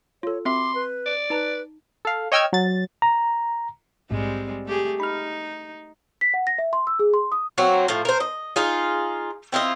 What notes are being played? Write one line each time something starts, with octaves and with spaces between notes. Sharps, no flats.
F4 A4 C#5
C4 F#4 E5 C6 D6
B4
D5
D#4 B4 A5 A#5
A4 F5
C#5 D#5 G5 E6 F6 G#6
F#3 A6
A#5
A#1 G#2 G3 G#3 C4
A3 G4 G#4
D#4 B5 F6
B6
F#5
A#6
E5
C6
E6
G#4
C6
D#6
F#3 A#3 C4 F#4
A2 F3
A#4 C5
D#5
D#4 F4 G#4
C4 E4 F4 D#5